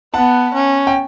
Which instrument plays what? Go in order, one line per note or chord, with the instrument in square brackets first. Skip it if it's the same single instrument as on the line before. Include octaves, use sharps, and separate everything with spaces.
[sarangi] B3 [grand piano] F#5 A5
[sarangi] C#4
[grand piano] G5